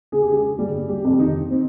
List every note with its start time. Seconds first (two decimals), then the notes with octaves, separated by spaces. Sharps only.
0.12 C#3 G#4
0.22 G4
0.31 G#3 G#4
0.58 G1 G3 G4
0.89 G3 G4
1.05 F2 C3
1.19 D#3 D#4
1.51 C4